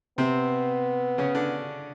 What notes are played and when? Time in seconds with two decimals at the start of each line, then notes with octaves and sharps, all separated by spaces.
0.18 C3 B3 C4
1.18 C#3 C#4
1.35 D3 D4